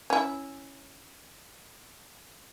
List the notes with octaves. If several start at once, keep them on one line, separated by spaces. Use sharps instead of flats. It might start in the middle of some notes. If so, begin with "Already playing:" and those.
C#4 E4